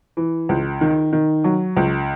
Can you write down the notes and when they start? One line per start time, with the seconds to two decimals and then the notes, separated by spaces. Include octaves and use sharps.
0.17 E3
0.49 C#2
0.81 D#3
1.13 D#3
1.44 F#3
1.76 C#2